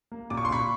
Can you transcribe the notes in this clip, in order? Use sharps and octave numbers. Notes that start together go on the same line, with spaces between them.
A#3
A#2 D6
C#6
C6
A#2 B5 C#6